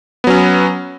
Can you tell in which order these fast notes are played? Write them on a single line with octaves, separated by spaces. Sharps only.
B3 F#3 C#4